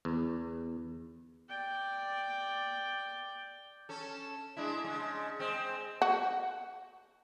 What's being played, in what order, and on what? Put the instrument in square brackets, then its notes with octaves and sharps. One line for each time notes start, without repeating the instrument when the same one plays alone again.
[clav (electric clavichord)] E2
[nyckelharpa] D5 G5
[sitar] C#4 A4
G#3 D4 E4
C#3 G#3
G#3 C4
[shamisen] F#4